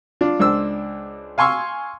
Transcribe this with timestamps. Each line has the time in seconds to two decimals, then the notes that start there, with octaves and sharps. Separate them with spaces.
0.21 D4 F4
0.39 C#2 D4 C5 E6
1.38 F5 G#5 C6 C#6 E6